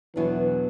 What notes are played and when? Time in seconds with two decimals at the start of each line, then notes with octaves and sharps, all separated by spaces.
0.16 E2 B2 E3 F#3 B3 D4